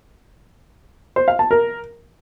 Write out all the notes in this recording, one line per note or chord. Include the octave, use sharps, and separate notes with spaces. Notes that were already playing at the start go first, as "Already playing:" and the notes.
C5
F5
A5
A#4